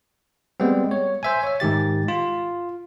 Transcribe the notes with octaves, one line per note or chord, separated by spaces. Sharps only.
G3 G#3 B3 C4
C#5
C5 E5 G#5
C#5 E5
G#2 D#3 G4 A6
F4